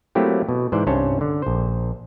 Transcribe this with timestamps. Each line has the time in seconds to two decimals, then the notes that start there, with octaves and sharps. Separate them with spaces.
0.15 F#3 A3 A#3 C4 E4 G4
0.49 B2
0.72 G#2 E3 C5 D5
0.87 C2 G2 C#4 C5 C#5 A5
1.21 D3
1.42 A#1 C5